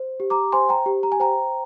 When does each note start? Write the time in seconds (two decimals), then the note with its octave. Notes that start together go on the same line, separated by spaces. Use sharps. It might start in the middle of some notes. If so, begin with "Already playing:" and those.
Already playing: C5
0.20 G4
0.30 A#5 D6
0.52 C5 G#5 C6
0.69 G5 A#5
0.86 G4
1.03 A#5
1.12 G#5
1.20 C5 G5 A#5